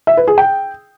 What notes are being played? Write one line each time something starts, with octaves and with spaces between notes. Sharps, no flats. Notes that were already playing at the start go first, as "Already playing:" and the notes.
E5
B4
G#4
G5